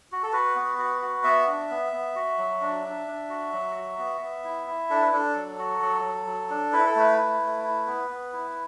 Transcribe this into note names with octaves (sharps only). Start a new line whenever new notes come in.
F#4
A4
F#4 B4
B3
F#4
F#4
B3 E5
D4
B3
B3
F#4
F#3
D4
D4
D4
F#4
F#3
F#4
B3
B3
E4
E4
D4 A4
B4
D4 A4
F#3
F#4
F#3
F#3
F#3
D4
E4 B4
A4
A3 B4
E4
A3
E4
B3
B3
E4